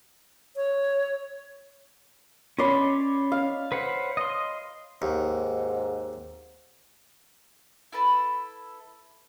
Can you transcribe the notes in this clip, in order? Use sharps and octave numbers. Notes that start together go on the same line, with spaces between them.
C#5
C#4 C#5 D5 B5 C6
F5
B4 C5 F#5
D#5 C6
D#2 G#2
E4 A4 B4 A5